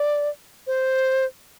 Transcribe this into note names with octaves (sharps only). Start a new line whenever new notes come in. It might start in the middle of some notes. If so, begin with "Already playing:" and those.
Already playing: D5
C5